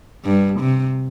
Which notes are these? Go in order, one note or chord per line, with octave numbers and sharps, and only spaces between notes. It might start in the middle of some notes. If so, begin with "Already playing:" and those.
G2
C3